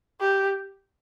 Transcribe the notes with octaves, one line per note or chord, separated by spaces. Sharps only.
G4